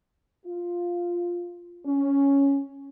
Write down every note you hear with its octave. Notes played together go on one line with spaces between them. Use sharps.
F4
C#4